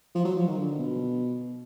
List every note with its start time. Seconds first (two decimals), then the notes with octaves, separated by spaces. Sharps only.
0.15 F3
0.25 F#3
0.36 F3
0.47 D#3
0.58 D3
0.78 B2